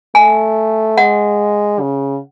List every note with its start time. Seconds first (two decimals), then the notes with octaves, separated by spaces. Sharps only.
0.15 A3 G#5
0.98 G#3 F#5
1.80 C#3